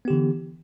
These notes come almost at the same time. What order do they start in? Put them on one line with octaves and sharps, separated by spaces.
B3 G4 D3 E3